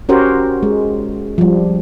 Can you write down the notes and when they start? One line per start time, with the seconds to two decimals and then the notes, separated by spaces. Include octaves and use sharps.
0.09 C#4 F#4 G4 A#4 C5
0.63 G#3
1.38 F3 G3